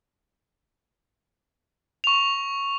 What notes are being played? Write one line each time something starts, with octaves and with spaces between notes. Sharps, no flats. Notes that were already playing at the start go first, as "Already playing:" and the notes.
C#6 F7